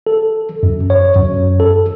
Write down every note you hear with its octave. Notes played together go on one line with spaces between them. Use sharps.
A4
F#2
C#5
F#2
A4